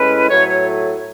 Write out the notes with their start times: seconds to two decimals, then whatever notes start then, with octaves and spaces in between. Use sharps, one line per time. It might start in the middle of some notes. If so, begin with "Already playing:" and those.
Already playing: A2 G#3 C#4 E4 B4
0.29 A2 F#3 A3 C#5
0.48 C#5